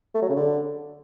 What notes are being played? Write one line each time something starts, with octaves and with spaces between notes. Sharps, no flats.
A3
F#3
C#3
D3